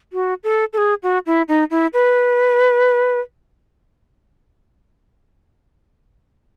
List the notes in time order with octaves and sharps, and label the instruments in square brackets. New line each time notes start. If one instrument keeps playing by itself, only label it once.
[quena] F#4
A4
A4
G#4
F#4
E4
D#4
E4
B4